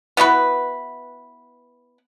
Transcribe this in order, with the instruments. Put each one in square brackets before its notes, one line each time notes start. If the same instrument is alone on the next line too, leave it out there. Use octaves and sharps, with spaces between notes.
[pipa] B3 E4 F#4 B4